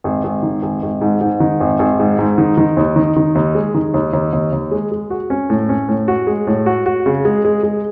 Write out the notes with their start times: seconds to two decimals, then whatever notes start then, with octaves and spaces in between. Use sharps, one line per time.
0.04 G#1
0.24 G#1
0.43 D#3
0.63 G#1
0.82 G#1
1.01 G#2
1.21 G#2
1.40 D#3
1.60 G#1
1.79 G#1
1.99 G#2
2.19 G#2
2.38 D#3
2.57 D#3
2.77 D#2
2.96 D#3
3.16 D#3
3.35 D#2
3.55 G#3
3.74 D#3
3.94 D#2
4.13 D#2
4.33 D#2
4.53 D#2
4.71 G#3
4.92 G#3
5.10 F#4
5.30 C#4
5.50 A2
5.69 C#4
5.89 A2
6.08 F#4
6.27 G#3
6.47 A2
6.66 F#4
6.86 F#4
7.06 C#3
7.25 G#3
7.45 G#3
7.63 G#3